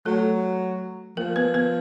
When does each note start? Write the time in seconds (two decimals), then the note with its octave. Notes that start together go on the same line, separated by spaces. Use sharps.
0.06 F#3 A3 A4
1.17 F3 A#3 A#4
1.36 B3 B4
1.54 B3 B4